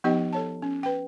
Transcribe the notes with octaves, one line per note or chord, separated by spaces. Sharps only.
F3 B3 D#4 G4 D#5 G5
A4 C#5 A5
C#4
B4 G5